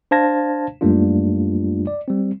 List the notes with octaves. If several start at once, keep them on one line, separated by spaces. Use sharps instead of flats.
D4 C5 F5 A5 G#6 A#6
F#2 G3 A3 A#3 D4 F4
D5
G3 C4